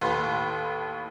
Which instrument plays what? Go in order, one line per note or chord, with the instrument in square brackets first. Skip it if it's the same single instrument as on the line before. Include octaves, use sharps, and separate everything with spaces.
[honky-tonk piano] D#2 A2 B4 C6